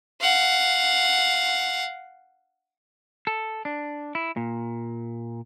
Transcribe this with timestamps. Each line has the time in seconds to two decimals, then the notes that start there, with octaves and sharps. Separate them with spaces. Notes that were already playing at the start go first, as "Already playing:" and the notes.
0.21 F5 F#5
3.27 A4
3.65 D4
4.15 E4
4.37 A#2